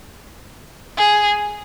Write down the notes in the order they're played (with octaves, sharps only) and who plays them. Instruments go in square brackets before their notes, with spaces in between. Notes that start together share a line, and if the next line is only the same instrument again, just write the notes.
[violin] G#4